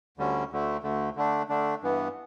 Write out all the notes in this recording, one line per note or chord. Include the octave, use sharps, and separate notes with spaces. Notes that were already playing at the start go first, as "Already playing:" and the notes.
D2 D3 G3 C#4
D2 D3 A3
D2 D3 A3
D3 A3 D4
D3 A3 D4
G2 E3 B3